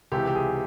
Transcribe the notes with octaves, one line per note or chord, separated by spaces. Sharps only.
C#2 C3 E3 G4
G4
G#4